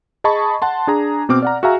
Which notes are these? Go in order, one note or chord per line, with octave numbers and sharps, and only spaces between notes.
G#4 D#5 A5 B5 C#6
F#5 A5 C6
D4 G#4 A#5
B2 C4 D6 F6
D5 F#5 A#5
F#4 G#4 E5 F5 G#5 A#5